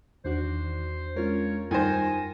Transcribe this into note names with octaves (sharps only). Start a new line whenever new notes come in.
E2 D#3 D4 F#4 C5
G#3 C#4 F4 A#4 C#5
F#2 D#3 G3 C5 G#5 A#6